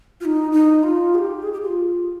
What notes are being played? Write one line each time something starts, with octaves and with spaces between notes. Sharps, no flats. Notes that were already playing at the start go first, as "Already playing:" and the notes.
F4
D#4
D#4
F4
G#4
G4
G#4
G4
F4